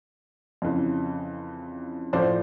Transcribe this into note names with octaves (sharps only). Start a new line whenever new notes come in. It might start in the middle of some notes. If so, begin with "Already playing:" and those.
F2 C#3 E3
A2 F3 C5 D5